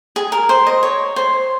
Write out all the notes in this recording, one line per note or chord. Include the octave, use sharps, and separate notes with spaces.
G#4
A#4
C5
D#5
C#5
C5